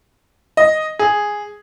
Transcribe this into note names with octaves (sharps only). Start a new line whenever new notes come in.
D#5
G#4